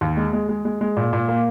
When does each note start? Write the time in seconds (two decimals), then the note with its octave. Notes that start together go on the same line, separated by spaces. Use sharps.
0.01 D#2
0.17 G#3
0.33 G#3
0.49 G#3
0.65 G#3
0.81 G#3
0.97 A#2
1.13 A#2
1.29 A#3